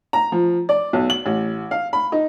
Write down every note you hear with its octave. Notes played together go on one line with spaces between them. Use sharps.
A#5
F3
D5
B1
F#7
A1
F5
B5
D#4